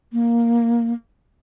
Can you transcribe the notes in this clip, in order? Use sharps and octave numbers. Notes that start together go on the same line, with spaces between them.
A#3